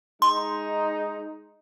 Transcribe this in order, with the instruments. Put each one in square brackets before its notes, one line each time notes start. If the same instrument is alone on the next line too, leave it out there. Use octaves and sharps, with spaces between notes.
[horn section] G#3 D#4 [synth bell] C6